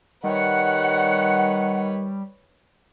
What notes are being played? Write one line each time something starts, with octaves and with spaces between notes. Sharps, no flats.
D#3 G3 B4 C#5 F#5